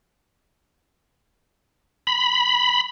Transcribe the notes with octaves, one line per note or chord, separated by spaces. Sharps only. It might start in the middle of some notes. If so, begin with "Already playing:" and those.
B5